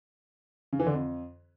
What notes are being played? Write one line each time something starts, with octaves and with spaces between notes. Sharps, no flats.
C#3
E3
D3
F2